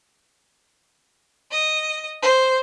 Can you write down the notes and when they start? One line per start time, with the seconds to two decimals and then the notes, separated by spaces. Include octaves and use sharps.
1.52 D#5
2.22 C5